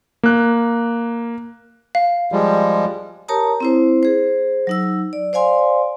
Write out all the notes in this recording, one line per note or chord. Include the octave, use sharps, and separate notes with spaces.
A#3 F#6
F5
F3 G3 G#3
G4 A#4 C#5 A5 A#5 D#6
C4 E4 C5
G#4 C5
F#3 D#4 E6
D5
C5 D5 F5 G#5 C6